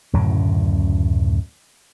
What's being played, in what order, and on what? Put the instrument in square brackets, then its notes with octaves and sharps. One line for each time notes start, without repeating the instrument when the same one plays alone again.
[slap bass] D1 F#2 A2 C#3